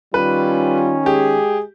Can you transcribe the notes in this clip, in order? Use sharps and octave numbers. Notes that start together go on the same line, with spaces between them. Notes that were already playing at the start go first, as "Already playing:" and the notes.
D#3 G3 C#4 F4 B4
G#3 G4 G#4